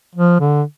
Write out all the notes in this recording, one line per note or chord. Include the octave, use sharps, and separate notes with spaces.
F3
D3